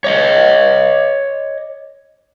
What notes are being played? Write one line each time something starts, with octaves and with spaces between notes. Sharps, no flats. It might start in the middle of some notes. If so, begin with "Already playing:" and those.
C#5 D#5